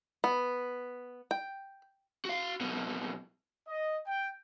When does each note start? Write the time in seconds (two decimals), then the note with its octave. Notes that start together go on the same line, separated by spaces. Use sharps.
0.24 B3
1.31 G5
2.25 F#4 F5
2.61 C2 B2
3.66 D#5
4.06 G5